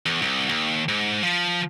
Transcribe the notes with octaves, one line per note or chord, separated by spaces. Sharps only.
E2
C2
D#2
G#2
F3